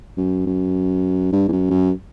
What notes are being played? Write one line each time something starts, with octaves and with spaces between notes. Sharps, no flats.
F#2
F#2
G2
E2
F#2
F#2